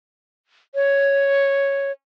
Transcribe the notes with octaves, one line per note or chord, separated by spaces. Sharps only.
C#5